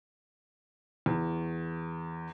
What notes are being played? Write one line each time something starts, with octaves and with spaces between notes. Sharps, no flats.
E2